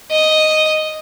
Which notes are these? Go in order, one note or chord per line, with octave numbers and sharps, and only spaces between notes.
D#5